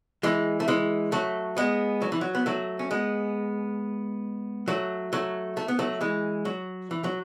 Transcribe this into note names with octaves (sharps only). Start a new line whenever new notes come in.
E3 G#3
A3
E3 G#3
F#3 A3
G#3 B3
F#3
E3
F#3
B3
F#3 A3
C#4
G#3 B3
F#3 A3
F#3 A3
A3
B3
F#3 A3
E3 G#3
F#3
E3
F#3